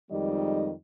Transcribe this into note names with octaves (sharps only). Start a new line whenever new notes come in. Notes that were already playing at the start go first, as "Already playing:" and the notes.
F2 D#3 G3 G#3 D#4 D#5